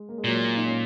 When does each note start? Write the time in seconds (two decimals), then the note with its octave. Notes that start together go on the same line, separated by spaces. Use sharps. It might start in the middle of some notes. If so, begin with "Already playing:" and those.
Already playing: G#3
0.09 A#3
0.18 G#3
0.24 A#2 F#3 A#3
0.55 D#4
0.65 C#4